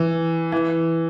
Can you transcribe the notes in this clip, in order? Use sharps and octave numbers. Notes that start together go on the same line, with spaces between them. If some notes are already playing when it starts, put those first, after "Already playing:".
Already playing: E3
E3